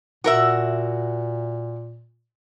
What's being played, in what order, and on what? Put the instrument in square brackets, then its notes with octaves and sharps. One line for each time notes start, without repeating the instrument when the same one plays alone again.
[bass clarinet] A#2 [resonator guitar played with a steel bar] F#4 A#4 E5